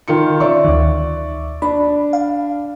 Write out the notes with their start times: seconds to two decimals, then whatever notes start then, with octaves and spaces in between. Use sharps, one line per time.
0.08 D#3 F4 C#7
0.40 D#3 C#4 D5 E5 C#6
0.64 D2 D#3
1.62 D4 B5
2.13 F5